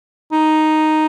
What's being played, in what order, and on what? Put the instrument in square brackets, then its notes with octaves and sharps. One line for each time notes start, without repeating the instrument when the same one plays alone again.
[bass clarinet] D#4